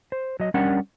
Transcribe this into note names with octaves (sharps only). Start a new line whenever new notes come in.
C5
F#3 D#5
G3 C#4 D4 G4 A#4 F#5